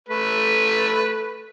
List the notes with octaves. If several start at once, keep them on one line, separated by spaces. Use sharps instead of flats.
A3 B4